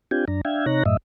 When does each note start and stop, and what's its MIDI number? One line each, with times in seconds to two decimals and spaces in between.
0.11 0.25 60
0.11 0.25 62
0.11 0.25 65
0.11 0.25 67
0.11 0.25 79
0.11 0.25 80
0.28 0.41 42
0.28 0.41 62
0.28 0.41 82
0.45 0.66 62
0.45 0.66 76
0.45 0.66 77
0.45 0.66 79
0.45 0.66 92
0.66 0.83 48
0.66 0.83 63
0.66 0.83 73
0.66 0.83 82
0.66 0.83 90
0.66 0.83 94
0.86 0.97 42
0.86 0.97 45
0.86 0.97 75
0.86 0.97 76